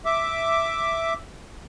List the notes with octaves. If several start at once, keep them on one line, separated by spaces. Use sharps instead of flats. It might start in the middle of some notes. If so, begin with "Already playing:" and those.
E5 D6